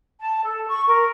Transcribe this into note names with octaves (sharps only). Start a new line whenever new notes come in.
A5
A4
C#6
A#4